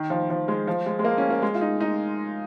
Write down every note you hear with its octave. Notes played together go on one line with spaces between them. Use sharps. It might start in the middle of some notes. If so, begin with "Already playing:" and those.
Already playing: D#3
F3
F3
G#3
F3
G#3
G#3
A#3
C#4
A#3
G#3
F4
D#4
D#4